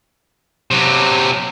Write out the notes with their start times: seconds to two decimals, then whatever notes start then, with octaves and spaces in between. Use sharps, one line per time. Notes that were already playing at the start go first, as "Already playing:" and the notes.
0.71 C3 F#3